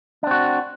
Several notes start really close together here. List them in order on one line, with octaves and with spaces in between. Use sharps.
D4 C4 F#4